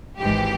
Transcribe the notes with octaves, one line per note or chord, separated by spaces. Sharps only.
G#1 G#2 E3 G4